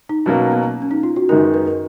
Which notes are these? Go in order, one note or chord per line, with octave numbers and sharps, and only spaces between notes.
D#4
B2 F#3 A#3 C#4
B3
C#4
D#4
F4
F#4
F#2 D#3 G#3 D#4 A#4
B4
B4
A#4